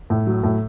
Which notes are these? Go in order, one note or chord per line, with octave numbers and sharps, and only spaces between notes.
A2
F#3
A2